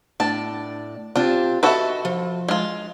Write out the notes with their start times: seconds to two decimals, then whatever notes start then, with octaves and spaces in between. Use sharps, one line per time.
0.20 A2 D4 D5 A5
1.16 C4 D4 F4 G4
1.63 F#4 A4 B4 D#5 E5
2.05 F3
2.48 G#3 F4